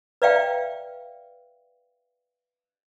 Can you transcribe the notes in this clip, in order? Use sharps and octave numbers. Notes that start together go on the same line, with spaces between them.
B4 D5 E5 F5 G5